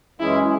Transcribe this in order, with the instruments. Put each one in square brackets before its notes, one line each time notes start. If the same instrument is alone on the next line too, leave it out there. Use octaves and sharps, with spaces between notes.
[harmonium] F#2 E3 G#3 C#4 G#4 [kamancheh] E4